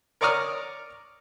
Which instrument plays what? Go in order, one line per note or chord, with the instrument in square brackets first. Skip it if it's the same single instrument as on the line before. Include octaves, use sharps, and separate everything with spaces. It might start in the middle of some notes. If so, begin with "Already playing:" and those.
[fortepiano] A#4 C#5 D5 A#5 D#6 F6